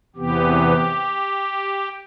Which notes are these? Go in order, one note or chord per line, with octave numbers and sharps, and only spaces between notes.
E2 C3 E3 B3 G4